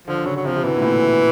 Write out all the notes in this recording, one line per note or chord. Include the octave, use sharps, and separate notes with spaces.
D3 F3
C#3 F#3
F#3
C3 F3
C3
B2 E3
A#2
A2